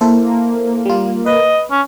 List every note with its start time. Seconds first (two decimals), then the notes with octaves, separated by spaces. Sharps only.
0.01 A#3 E4 A4 C5
0.86 G3 F4
1.26 B4 D#5
1.71 C#4